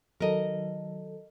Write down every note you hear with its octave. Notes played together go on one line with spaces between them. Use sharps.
D#3 F#3 A4 A#4 D#5